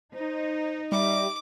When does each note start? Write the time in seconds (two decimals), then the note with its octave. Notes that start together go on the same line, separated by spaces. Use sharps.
0.14 D#4 C5
0.92 G3 E5 D6